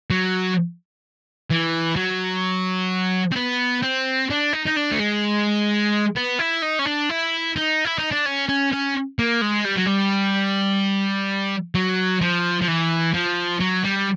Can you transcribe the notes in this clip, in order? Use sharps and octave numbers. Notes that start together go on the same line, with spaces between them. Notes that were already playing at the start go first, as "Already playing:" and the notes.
F#3
E3
F#3
C4
B3
C4
D4
D#4
D#4
D4
A3
G#3
B3
E4
D#4
C#4
D4
E4
D#4
E4
D#4
D4
C#4
C#4
C#4
A#3
G#3
G3
F#3
G3
F#3
F3
F3
E3
F3
F#3
G3